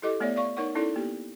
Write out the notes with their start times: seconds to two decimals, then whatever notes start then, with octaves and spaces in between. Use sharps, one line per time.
0.02 E4 G4 A4 D#5 D6
0.20 A3 B3 C#5 D5 E5
0.36 D5 F5 C#6
0.57 D#4 A#4 C#5 F#5 C#6
0.75 C#4 D#4 E4 A4 D5
0.96 A#3 B3 G4